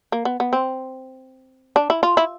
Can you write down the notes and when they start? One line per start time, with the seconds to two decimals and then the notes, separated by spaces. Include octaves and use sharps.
0.12 A#3
0.25 B3
0.40 B3
0.53 C4
1.76 D4
1.90 E4
2.03 F4
2.17 E4